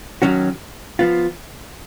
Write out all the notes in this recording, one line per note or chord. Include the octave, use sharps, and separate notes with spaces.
D#3 F#3 C#4 F#4
F3 B3 F4